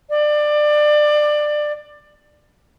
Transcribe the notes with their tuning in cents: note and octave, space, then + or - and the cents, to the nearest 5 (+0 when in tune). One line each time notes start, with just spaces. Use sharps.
D5 +20